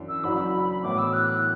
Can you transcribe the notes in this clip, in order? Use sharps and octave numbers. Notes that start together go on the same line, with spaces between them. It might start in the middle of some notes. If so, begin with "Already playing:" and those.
Already playing: F#2 E3 D4
E6
F#1 F#2 F#3 D4 F#4 B5
A2 E3 B3 F#4 D6
E6
F#6